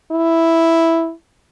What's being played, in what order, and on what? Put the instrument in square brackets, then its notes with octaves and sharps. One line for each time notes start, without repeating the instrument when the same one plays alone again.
[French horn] E4